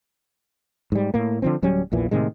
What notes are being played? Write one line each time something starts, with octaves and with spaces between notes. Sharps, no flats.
G#2 G3
A2 A#3
D3 F3 C4
D1 F#3 G3 C#4
A#1 E2 A#2 E3
A2 C3 D#3 G#3